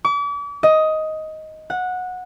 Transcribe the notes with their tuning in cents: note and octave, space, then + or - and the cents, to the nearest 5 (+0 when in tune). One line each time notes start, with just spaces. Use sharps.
D6 -40
D#5 +10
F#5 -15